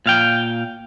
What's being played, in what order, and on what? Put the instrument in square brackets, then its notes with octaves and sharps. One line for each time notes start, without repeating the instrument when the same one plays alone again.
[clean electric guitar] A#2 F5 G5